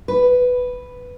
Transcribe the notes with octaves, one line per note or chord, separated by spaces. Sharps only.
B4